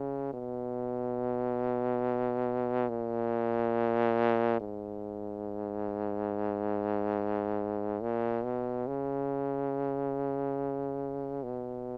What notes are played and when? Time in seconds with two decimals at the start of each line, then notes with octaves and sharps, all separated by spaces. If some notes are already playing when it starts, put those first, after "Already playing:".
Already playing: C#3
0.33 B2
2.89 A#2
4.60 G#2
8.02 A#2
8.44 B2
8.87 C#3
11.43 B2